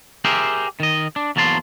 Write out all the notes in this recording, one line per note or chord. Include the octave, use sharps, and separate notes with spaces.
G4 G#4 A#4 C5 E5 G5
D#3 D#5
D4
E2 F#3 A#3 A5 C6